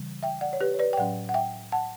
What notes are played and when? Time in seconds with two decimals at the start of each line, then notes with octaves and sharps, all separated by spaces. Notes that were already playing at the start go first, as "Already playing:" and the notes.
Already playing: C#3 E3 G3
0.23 E5 G5
0.41 D5 F#5
0.53 C#5
0.61 G4 B4
0.74 C#5
0.79 B4 D5
0.93 G5
0.98 A2 F#3 C#4 D5 F#5
1.29 F#5
1.34 E5 G5
1.72 F#5 A5